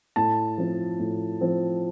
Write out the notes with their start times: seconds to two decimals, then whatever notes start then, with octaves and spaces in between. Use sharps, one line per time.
0.16 A2 A5
0.58 F3 C4
0.99 A2
1.41 F3 C4